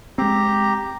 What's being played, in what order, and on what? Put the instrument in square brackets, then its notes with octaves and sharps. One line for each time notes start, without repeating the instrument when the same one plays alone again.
[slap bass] G#3 C4 [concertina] G4 A#5